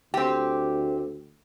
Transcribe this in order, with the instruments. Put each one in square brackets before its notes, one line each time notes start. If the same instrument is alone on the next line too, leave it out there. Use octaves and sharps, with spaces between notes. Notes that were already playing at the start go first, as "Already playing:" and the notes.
[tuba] D2 [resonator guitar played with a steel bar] C4 G4